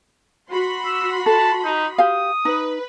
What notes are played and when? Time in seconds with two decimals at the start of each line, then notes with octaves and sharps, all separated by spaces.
0.51 F#4 B5 C6
0.85 E6
1.26 A4 A5
1.65 D#4
1.98 G4 F5 D#6
2.45 D#4 B4